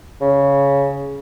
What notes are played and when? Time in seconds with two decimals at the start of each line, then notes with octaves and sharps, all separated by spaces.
0.21 C#3